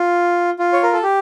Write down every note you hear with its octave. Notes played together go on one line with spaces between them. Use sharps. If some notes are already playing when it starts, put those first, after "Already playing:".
Already playing: F4
F4
C#5
A#4
A4
G4